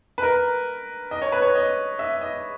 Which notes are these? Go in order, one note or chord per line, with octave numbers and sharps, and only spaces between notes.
B4
A#4
D#5
C#5
B4
C#5
D#5
E5
D#5